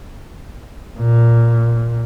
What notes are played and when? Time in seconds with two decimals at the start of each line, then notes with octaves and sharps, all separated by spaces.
0.99 A#2